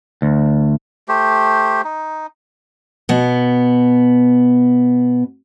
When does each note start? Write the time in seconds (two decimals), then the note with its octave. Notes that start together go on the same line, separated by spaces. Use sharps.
0.22 D2
1.08 A3 G4 C5
1.84 D#4
3.09 B2 B3